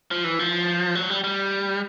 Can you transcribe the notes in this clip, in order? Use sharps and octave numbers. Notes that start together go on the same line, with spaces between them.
F3
E3
F3
F#3
G3
G3